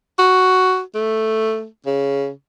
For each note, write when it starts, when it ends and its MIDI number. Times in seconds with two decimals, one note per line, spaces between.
0.19 0.81 66
0.95 1.66 57
1.86 2.30 49